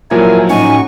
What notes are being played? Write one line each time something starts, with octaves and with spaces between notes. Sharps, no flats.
A#2 F3 F#3 E4 A#4 G#5
A2 C#4 D#4 F#4 G#5 C#6